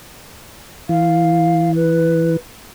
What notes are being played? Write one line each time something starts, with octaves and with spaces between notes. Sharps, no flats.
E3 F5
B4